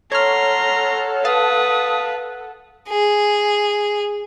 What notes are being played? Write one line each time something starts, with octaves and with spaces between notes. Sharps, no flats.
A4 C#5 F#5 A#5 C6 F6
B4 F5 A5 D#6
G#4